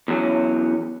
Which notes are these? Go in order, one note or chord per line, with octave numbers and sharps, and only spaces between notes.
E2 F#3 C#4